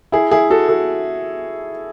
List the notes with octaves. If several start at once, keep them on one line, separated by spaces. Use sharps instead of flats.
E4 G#4
E4 G#4
F#4 A4
F#4 A4